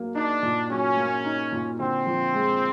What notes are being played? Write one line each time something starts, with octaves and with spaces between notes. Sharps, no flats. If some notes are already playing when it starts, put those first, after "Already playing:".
Already playing: F#3 A#3
D4 D#4
A#2
F#3 C#4
A#3
D#4
A#2
D3 C4
F3
G#3